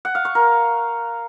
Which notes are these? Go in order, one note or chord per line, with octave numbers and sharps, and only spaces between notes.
F#5
F5
C#6
A#4